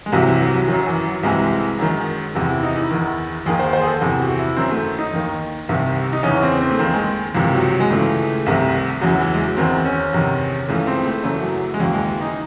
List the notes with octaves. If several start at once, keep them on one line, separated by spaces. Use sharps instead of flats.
G#3
C2 C3 E3 F#3
E3
F#3
F#3
F#2 D#3 F#3
E3
F#3
C2 C3 E3 G#3
F#2 D#3
E2 C3 E3 E4
E4
D#4
E4
E2 D#3
D#2 D#3 G#4
C5
C5
G#4
A4
E2 C3 E3 G#4
F#4
E4
F#2 D#3 C4
A3
D#4
D#2 D#3
C2 C3 D#3
D#4
E2 C#3 E3 C#4
C4
C4
A3
D#2 D#3 C4
G#3
C#2 C3 D#3 E3
F#3
F#3
G#3
C#2 C#3 E3 A3
C2 C3 D#3
E2 C#3 E3 F#3
F#3
E3
G#3
F#3
E2 D#3 C4
C#4
E2 C3 D#3
C#2 C#3 E3 A3
C4
A3
F#2 C#3 E3 A3
F#3
G#3
D#2 C#3 E3 F#3
G#3
D#4